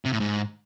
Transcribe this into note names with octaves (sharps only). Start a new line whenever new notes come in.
C3
A2
G#2